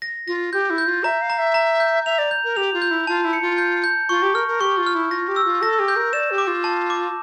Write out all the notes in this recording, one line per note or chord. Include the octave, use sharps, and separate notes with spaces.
A#6
F4 A#6
G4 G6
E4
G6
F4
E5 A#5
F5
A#5
E5
A#5
G6
E5 F7
D5
G6
A#4
G4 F7
F4
G6
E4
F4 A5
E4
C#7
F4
G6
G6
F4 C#6
G4
A#4 F6
A#4
G4 C#6
F4
F6
E4
F4 A#6
G4
E6
F4
A4 A#6
G4
G6
A#4
D5 E7
G4
D6
F4
A5
D6